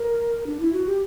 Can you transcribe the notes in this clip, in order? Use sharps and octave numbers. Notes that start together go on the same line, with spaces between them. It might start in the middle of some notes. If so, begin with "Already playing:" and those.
Already playing: A#4
D4
E4
F#4
G4